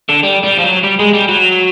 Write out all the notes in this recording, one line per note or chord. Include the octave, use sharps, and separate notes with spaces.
D3
G3
G3
F3
F#3
G3
G#3
G3
F#3